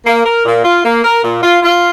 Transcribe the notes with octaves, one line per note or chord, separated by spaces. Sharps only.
A#3
A#4
A#2
F4
A#3
A#4
A#2
F4
F4